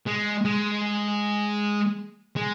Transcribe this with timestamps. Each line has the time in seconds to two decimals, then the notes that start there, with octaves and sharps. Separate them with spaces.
0.07 G#3
0.45 G#3
2.37 G#3